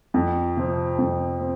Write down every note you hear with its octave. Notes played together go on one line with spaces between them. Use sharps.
F2
C3 F3 C4
F2
C4